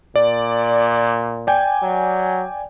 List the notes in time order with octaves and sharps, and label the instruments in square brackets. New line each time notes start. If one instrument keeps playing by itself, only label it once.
[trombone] A#2 [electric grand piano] D5
[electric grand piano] D5 G5 G#5
[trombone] F#3